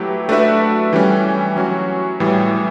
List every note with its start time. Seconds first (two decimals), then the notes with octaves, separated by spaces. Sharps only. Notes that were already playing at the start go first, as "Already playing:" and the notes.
Already playing: F#3 A3 E4 G4 B4
0.29 A3 D4 F#4 B4 E5
0.93 E3 G3 C#4
1.57 F#3 C#4 F#4
2.20 A2 E3 G3